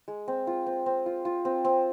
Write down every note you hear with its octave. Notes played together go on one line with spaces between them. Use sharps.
G#3
C4
F4
C4
C4
F4
F4
C4
C4